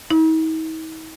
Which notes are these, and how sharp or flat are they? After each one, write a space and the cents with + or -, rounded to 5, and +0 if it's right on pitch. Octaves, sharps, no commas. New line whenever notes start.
D#4 +45